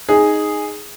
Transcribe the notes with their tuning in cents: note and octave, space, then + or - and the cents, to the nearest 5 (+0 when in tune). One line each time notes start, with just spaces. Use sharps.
D#4 +0 G#4 +0